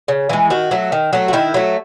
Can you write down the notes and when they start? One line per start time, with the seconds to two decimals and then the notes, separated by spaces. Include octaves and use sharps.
0.08 C#3
0.29 E3 G#3
0.50 D#3 F#4
0.71 F#3 A3
0.92 D#3
1.13 F#3 A3
1.28 F#4
1.33 D#3 E4
1.54 F#3 A3